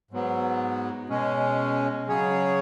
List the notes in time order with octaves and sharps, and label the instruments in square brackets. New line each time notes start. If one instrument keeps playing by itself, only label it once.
[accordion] G#2 F#3 B3
B2 G#3 C#4
C#3 F#3 C#4 G#4 C#5